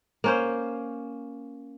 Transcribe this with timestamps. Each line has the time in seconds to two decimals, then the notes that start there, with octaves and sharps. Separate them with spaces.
0.24 A#3 C#4 C5